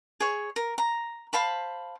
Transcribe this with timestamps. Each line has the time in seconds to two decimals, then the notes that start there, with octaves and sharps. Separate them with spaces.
0.20 G#4 C#5
0.56 A#4
0.78 A#5
1.33 C5 F5 A5 B5